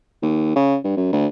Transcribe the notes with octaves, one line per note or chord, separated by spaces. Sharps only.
D#2
C#3
G2
F#2
D2